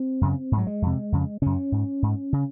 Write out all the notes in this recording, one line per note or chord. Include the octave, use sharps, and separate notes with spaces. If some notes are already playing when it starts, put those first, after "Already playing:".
Already playing: C4
F#2 C#3
G#2
F#3
G#3
F2 C3
F2 C#3
F#2 C#3 C#4
G#2
G#2
C#3